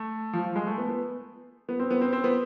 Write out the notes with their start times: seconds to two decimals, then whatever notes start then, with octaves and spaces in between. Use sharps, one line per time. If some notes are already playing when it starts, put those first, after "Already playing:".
Already playing: A3
0.33 F3
0.44 F3
0.56 G#3
0.67 A3
0.78 B3
0.89 B3
1.69 B3
1.80 C4
1.91 B3
2.01 C4
2.13 C4
2.24 B3